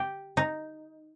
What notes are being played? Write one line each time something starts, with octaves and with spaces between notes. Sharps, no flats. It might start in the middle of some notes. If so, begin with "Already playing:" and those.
Already playing: G4
D#4